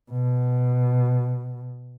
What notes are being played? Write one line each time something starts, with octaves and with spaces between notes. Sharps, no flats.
B2